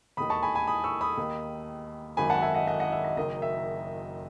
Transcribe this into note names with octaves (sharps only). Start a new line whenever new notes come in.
E1 D#2 D#3 B5 D#6
A5 C#6
G#5 B5
G#5 B5
B5 D#6
C#6 E6
B5 D#6
D#2 D#3
G#1 F#2 D#3 G#5 B5
F#5 A5
E5 G#5
D#5 F#5
D#5 F#5
D#5 F#5
E5
D#5
F#1 F#2 D#3 D#5
E5